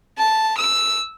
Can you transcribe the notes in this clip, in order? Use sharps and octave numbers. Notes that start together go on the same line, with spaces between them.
A5
E6